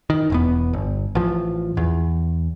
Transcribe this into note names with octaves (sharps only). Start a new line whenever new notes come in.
D#3
E1 E2 B3
G1
A1 F3
E2